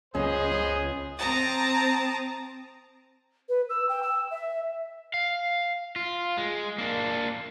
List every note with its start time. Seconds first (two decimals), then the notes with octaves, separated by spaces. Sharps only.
0.15 C#2 B3 C#4 G#4 C5 D#5
0.51 C#4
1.17 C4 A5 A#5 D#6
3.49 B4
3.69 E6
3.89 G5
4.03 E6
4.31 E5
5.14 F5
5.96 F4
6.37 G#3
6.78 A#3 D4